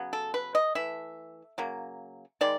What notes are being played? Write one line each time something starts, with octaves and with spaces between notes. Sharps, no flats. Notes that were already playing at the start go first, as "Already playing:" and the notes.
Already playing: C#3 F#3 B3
A4
B4
D#5
E3 A3 E5
C#3 F#3 A#3
D#3 G#3 D5